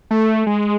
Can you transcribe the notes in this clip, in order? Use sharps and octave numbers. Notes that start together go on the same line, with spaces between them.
A3
G#3